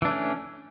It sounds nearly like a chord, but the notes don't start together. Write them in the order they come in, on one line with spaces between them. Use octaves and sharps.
E3 D4 A3 C#4